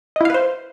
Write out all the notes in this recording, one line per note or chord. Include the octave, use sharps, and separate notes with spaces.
E4 B4 C5 D#5 F5